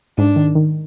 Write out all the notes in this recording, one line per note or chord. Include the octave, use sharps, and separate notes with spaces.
G#2 D4
D#3
D#3